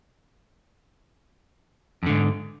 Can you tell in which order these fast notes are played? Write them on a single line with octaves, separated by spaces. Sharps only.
F2 D3 G#2